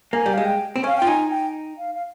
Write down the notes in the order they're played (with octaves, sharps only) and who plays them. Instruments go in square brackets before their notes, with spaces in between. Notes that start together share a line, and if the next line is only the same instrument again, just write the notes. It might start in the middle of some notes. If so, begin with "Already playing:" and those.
[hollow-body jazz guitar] A#3 [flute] G#5
[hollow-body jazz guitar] G3
[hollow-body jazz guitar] G#3 [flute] F5
[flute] G5
[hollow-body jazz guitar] C4
[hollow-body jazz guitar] C#4 [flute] F5
[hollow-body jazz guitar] F4 [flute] G5
[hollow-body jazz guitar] D#4 [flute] G#5
[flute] G5
F5
F5